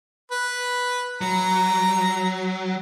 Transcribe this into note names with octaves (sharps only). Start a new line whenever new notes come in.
B4
F#3 A#5